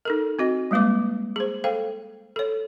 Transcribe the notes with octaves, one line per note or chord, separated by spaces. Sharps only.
D#4 A4 A#4
C4 F#4 D#5
G3 G#3 A#3 B4 D6
G#4 C5
A4 C5 F5 G5
A4 C#5